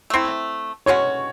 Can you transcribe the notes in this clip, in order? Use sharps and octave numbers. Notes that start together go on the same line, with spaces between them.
A3 C4 E4
B2 G#3 C#4 F#4 C#5